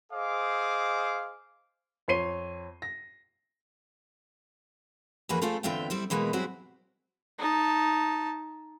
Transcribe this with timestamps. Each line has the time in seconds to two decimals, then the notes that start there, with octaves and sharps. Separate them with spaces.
0.12 G#4 C5 D#5 F5 D6
2.08 F2 C#5 C6 C7 D#7 G7
2.82 A#6
5.29 F2 E3 A#3 F#4 G#4 B4
5.42 A3 C4 F4 G#4 A4 F5
5.63 E2 D3 C4 F4 E5 G5
5.90 G3 C4 E4
6.10 B2 E3 G#3 A#3 B3
6.33 F#3 G3 C4 E4 F#4 G#4
7.38 D#4 A5